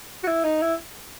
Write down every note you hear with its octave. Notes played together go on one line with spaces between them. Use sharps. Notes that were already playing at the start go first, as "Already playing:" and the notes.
F#4
E4
D#4
E4